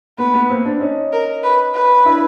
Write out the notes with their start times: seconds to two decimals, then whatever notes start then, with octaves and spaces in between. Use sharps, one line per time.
0.18 B3 B4
0.34 B3
0.50 A#3 C4
0.65 C4 D4
0.81 C#4 D#4
1.13 A#4
1.43 B4
1.74 B4
2.05 D4 E4